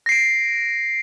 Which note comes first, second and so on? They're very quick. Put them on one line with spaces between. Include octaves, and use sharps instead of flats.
A#6 C7 D7